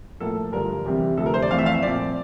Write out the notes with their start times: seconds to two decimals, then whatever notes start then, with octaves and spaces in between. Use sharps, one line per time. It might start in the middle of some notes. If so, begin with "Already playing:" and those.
0.20 A2 F3 A#3 A4
0.52 G2 D3 F3 A#4
0.86 E2 C3 G3 C4
1.17 D2 C3 F3 A4
1.26 A#4
1.34 C5
1.42 D5
1.50 F2 E3 A3 C4 F5
1.59 E5
1.66 F5
1.74 E5
1.83 A#2 F3 C4 D5